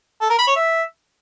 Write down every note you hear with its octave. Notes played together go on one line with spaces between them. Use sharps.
A4
A#4
B5
C#5
E5